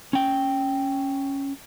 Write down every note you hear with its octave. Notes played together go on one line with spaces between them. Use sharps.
C#4 G5